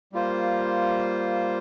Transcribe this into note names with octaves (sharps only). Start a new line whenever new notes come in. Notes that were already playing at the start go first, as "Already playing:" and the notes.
G3 A#3 F4 C5